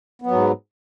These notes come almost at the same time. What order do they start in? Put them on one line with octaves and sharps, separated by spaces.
B3 F#3 G#2